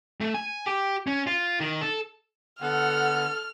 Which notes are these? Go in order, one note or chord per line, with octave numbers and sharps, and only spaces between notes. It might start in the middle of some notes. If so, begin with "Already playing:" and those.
A3
G#5
G4
C#4
F4
D#3
A4
D3 B3 A4 F#5 F6